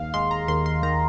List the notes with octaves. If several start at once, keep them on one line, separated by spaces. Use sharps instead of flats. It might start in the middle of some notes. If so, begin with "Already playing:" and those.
Already playing: D#2 F5
G#3 C6
A#5
D#2 C6
C6
D#3 A#5